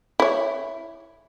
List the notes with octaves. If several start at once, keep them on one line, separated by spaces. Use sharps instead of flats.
E4 C#5